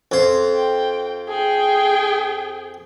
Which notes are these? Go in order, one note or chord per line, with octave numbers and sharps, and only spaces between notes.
F2 C5
G5
G#4 G5